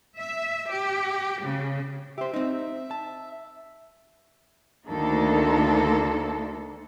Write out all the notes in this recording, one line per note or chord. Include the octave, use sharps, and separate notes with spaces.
E5
G4
C#3
G4 C5 E5
C4 D#4
A5
D2 D#3 A#3 D4 A4